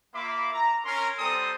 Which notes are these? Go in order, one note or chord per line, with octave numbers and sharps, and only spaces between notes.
A#3 F4 E5 B5 D6
A#5
C#4 A#4 C6
G3 C4 A4 C5 A#5 D#6